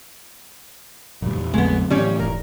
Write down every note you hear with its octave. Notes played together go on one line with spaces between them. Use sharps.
D2 G2 A#2 F3 G3
E2
A#1 F2 D3 F#3 G#3 A3 B3 C4
A2 E3 F3 G3 C#4 C#5
D#1 G#2 A#4